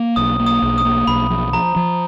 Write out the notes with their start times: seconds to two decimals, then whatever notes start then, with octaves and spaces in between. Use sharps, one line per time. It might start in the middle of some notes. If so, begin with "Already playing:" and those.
Already playing: A#3
0.16 B1 D#6
0.39 A#3
0.47 D#6
0.62 B1
0.78 D#6
0.85 A#3
1.07 B1 B5
1.30 F3
1.53 F3 A#5
1.76 F3